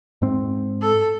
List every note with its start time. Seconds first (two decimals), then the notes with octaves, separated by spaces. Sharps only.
0.22 G#2 C4
0.82 A4